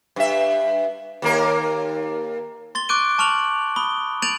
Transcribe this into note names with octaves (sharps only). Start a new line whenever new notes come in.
G2 E5
D#2 A#3 A#4
C6 A6 G7
C#6 D6 F#6 G6 D7 D#7
A5 C#6 F6 F7 F#7
B5 D#6 G7
G6 A6 D7 D#7 F7 F#7